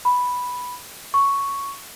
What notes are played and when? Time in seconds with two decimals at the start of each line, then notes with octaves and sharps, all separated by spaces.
0.05 B5
1.14 C#6